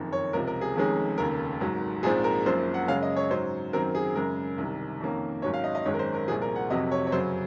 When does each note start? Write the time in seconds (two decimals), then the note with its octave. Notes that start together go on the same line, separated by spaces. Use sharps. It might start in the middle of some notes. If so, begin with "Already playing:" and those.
Already playing: F#1 F2 D#3
0.12 C#5
0.33 C#2 C3 F3 A#4
0.47 A#4
0.61 G#4
0.76 F1 F2 D#3 G#3 C#4 G#4
1.18 F1 D#2 C#3 A#4
1.60 G#1 G#2 F#3
2.03 A#1 G#2 F3 C4 G#4
2.24 A#4
2.46 G#1 F#2 F3 A#3 C5
2.74 F#5
2.88 F#2 C#3 G#3 C#4 F5
3.03 D#5
3.16 C#5
3.31 G#2 F#3 C#4 C5
3.73 F#2 D#3 F#3 C4 A#4
3.95 G#4
4.15 F#2 C#3 G#3 A#4
4.58 C2 C3 D#3
5.00 F2 D#3 A#3 C#4
5.42 G#1 G#2 F#3 C#4 C#5
5.54 F5
5.64 D#5
5.75 D#5
5.85 G#1 F#2 D#3 G#3 C#5
5.94 A#4
5.99 C5
6.14 A#4
6.27 C2 A#2 F3 G#4
6.42 A#4
6.56 F#5
6.70 F1 F2 C3 F#3 D#5
6.91 C#5
7.07 C#5
7.12 F#2 C#3 F#3 C5